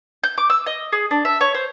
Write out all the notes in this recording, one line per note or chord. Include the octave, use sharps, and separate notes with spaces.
G6
D6
E6
D#5
G#4
D4
E5
C#5
C5